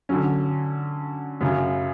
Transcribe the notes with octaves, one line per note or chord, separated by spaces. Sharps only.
D3 F#3 C#4
F#2 C#3 F#3 C#4